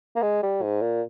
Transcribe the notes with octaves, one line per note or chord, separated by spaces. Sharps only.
A#3
G#3
G3
G#2
A#2